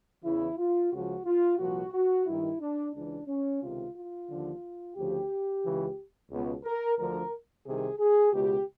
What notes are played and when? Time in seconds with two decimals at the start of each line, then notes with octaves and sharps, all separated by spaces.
0.24 E2 C#3 E3 E4
0.58 F4
0.92 C#2 C#3 F3 F#4
1.26 F4
1.59 C2 A#2 F3 F#4
1.93 F#4
2.26 G2 D#3 E4
2.60 D4
2.93 C#2 C#3 E3 D4
3.28 C#4
3.61 C#2 C3 D#3 F4
3.95 F4
4.29 D#2 D3 F3
4.96 D2 C#3 F3 G4
5.63 C#2 C#3 E3
6.31 C#2 B2
6.64 A#4
6.98 D2 D3 F3 A#4
7.65 C2 C3 D#3 G#4
7.99 G#4
8.32 C#2 B2 G4